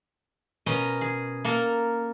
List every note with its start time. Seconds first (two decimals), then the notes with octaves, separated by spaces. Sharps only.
0.66 B2 C#4 A#4 D#5
1.01 G#4
1.45 A#3 A4 A#4